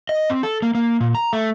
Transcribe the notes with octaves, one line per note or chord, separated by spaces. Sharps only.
D#5
C4
A4
A#3
A#3
A#2
A#5
A3